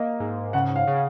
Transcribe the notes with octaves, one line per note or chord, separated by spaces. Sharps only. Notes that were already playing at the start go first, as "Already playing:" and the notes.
Already playing: A#3 D#5 F5
G#2
C#3 F#5
F5
C#3